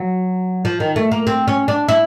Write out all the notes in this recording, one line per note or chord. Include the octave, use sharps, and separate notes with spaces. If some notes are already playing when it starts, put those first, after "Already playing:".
Already playing: F#3
F3
D#3
A3
A#3
C4
C#4
D4
E4